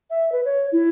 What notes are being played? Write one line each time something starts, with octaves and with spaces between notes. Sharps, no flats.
E5
B4
C#5
E4